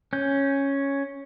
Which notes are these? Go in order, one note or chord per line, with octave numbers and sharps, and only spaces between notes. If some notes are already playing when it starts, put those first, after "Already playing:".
C#4 G6